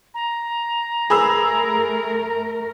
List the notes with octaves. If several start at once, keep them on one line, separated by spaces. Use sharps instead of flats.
A#5
A3 G#4 A#4 B5 E6